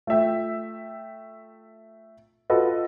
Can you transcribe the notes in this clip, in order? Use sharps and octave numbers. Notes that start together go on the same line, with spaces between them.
A3 F4 E5 G5
F4 F#4 A4 B4 D#5